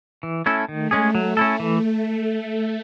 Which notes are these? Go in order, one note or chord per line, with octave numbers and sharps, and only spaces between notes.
E3
A3 C#4 E4 A4
D#3 A3
G#3 C#4 G#4
F#3
C#4 E4 A4
E3